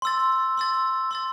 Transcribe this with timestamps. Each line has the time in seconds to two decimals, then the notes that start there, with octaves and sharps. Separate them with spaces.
0.02 C6 E6 A6
0.57 C6 E6 A6
1.11 C6 E6 A6